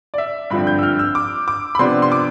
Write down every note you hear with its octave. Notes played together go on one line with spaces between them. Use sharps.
D5
E5
G2 D3 F3 C4 B5
G6
E6
F6
E6
D6
D6
B5
C3 F3 B3 D4 C6
C6
D6